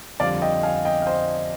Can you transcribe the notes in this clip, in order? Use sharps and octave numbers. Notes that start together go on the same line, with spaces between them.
F2 D3 G3 D5 F5
D#5 G5
F5 G#5
D#5 G5
F5
C5 D#5